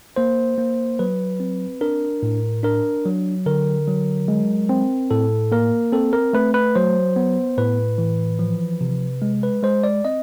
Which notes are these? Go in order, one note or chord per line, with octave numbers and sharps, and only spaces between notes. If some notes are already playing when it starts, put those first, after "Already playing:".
A#3 C5
A#3
F#3 B4
C4
D4 A#4
A2
D4 A#4
F#3
D3 A#4
F#3
G#3
C4
A2 A4
A#3 A#4
C4 A4
A#4
A3 B4
B4
F#3 C5
B3
A2 B4
E3
F3
C3
G#3
B4
G#3 C5
D5
C4 D#5